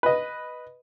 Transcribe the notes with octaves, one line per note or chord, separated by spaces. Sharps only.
B4 D#5